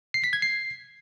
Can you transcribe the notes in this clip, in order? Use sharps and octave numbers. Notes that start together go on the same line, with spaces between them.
C7
B6
G#6
C7